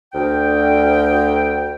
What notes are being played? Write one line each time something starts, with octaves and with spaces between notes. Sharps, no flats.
D2 G5